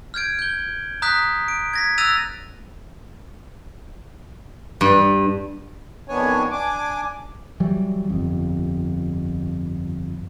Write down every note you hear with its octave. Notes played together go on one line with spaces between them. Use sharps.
F6 G6 G#6 D7
G6 G7
A#5 D#6 F#6 G6 B6
D7
G#6 A#6 B6
E6 F#6 A6 A#6 D#7 F7
G2
F2 D#3 B3 D4 C#5 G#5
D4 G#5 D6
E3 F#3 G3
G1 F2